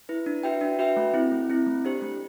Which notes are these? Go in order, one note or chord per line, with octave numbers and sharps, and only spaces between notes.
E4 B4
D4
F#4 B4 E5 G5
D4
F#4 B4 E5 G5
A3
C4 E4
A3
C4 E4
A3
D4 G4 C5
A3